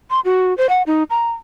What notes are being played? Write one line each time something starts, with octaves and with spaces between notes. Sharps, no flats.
C6
F#4
C5
F#5
D#4
A#5